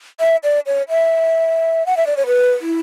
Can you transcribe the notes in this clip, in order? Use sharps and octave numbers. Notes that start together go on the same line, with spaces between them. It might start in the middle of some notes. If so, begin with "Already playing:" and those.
E5
D5
C#5
E5
F#5
E5
D5
C#5
B4
E4